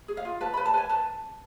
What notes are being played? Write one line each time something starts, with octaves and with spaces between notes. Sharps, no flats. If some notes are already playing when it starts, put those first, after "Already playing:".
G#4
F5
F4
B4 A5
B4 B5
A5
B4 G#5
B4 A5